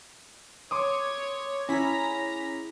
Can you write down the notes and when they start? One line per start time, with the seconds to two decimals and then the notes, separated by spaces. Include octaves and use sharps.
0.71 C#5 C6 D6 D#6
1.69 C#4 E4 G#4 A#5 B6